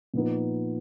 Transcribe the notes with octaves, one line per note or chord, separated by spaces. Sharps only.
A#2 F3 B3 D#4